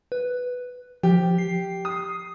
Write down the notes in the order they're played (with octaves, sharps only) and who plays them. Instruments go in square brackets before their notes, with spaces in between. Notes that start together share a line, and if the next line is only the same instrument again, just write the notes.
[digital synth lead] B4
[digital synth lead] F3 [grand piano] G4
[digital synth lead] C7
[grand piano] D#6